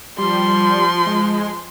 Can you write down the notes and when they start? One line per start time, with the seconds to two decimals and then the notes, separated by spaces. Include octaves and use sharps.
0.19 F3 G3 C6
1.07 G#3